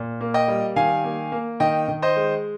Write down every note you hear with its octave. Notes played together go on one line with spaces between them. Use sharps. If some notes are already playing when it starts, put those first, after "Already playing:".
Already playing: A#2
A#3
D#5 G5
G3
D#3 F5 G#5
A#3
A#3
D#3 D#5 G5
D#3
C5 D#5
G#3